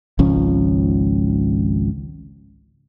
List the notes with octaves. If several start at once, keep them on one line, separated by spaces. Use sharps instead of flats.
G#1 C#2 F3 C#4